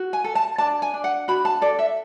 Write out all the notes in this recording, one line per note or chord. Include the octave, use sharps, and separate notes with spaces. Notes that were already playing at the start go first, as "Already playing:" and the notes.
Already playing: F#4
G#5
A4
A5
D4 A5
G#5
D4
F#5
F#4 B5
A5
A4 D5
E5